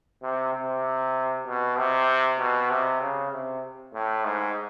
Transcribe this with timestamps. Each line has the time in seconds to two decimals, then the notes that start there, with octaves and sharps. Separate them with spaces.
0.23 C3
0.53 C3
1.47 B2
1.78 C3
2.39 B2
2.70 C3
3.01 C#3
3.32 C3
3.94 A2
4.24 G#2